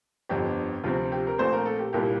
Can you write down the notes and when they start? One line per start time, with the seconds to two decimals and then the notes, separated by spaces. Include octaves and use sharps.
0.29 G1 F2 D3 G4
0.83 D2 C3 F3 C4 F4
1.12 G4
1.27 A#4
1.38 A#1 A#2 A3 C4 C5
1.53 A#4
1.66 A4
1.79 G4
1.93 C2 A#2 G3 A#3 G4